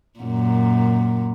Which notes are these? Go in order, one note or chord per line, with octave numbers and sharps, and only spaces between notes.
F#2 A#2